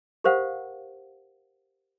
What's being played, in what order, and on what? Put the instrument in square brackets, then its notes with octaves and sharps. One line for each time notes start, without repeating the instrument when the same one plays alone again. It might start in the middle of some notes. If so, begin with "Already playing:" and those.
[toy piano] G4 A#4 C5 F5 F#5